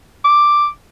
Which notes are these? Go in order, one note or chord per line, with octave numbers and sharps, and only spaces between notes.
D6